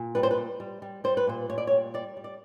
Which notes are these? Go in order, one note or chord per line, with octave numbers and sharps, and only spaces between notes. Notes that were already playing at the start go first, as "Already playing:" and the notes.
Already playing: A#2
G3 B4
C5
B4
G3
G3
G3
G3 C5
B4
A#2 C5
A#2 C#5
D5
C#5
G3
G3 D5
G3
D5